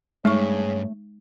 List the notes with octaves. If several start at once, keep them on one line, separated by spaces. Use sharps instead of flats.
G2 C#3 G#3 A3 D#4 G#4 C#5 C#6